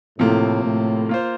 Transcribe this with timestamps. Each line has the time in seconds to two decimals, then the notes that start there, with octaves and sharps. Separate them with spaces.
0.19 A2 C3 F3 A#3
0.64 A2
1.09 A#3 F4 C5